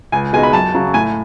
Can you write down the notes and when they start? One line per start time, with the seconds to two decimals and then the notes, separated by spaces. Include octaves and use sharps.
0.12 C#2 G#5
0.33 B2 G#3 D#4 G#5
0.43 B5
0.53 F#2 A5
0.74 C#3 F#3
0.94 A2 G#5